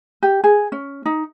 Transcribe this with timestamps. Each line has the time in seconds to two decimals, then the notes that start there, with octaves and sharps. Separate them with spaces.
0.23 G4
0.44 G#4
0.72 C#4
1.05 D#4